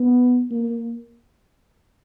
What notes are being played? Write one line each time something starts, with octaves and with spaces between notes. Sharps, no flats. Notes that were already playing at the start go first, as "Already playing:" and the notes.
Already playing: B3
A#3